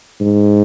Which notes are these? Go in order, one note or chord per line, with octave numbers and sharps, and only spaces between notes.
G#2